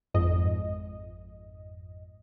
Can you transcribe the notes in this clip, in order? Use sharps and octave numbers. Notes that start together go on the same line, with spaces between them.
G#1 F2 G#2 D#5